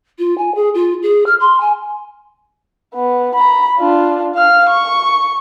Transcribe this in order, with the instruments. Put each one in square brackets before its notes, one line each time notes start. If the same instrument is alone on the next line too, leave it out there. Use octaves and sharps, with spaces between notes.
[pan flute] F4
G#5
G#4
F4
G#4
F6
C6
G#5
[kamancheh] B3
A#5 B5
D4 F4
F5 F6
C#6